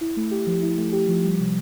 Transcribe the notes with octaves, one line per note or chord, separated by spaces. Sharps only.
E4
A3
G4
F3
E4
A3
G4
F3
G3
C3